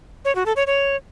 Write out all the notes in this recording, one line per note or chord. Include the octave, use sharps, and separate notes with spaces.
C#5
F#4
A4
C#5
C#5